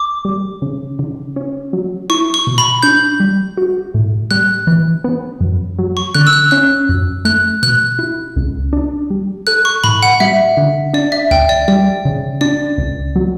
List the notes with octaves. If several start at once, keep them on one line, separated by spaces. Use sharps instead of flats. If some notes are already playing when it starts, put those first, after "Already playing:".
Already playing: D6
G3
C#3
C#3
C#4
F#3
E4 C#6
C#6
B2
B5
D4 G6
G3
F#4
A2
G3 F#6
E3
B3
F#2
F#3
C#6
D3 F#6
E6
F#6
C#4 F#6
F#2
A3 F#6
B2 F#6
E4
C#2
D4
G3
A4 F#6
C#6
A2 B5
F#5
G3 E5
D3
D4 D5
E5
D2 G5
D5
G3 D5
C#3
D4 D5
C#2
F#3